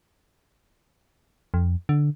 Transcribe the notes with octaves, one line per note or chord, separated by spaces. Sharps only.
F2
D3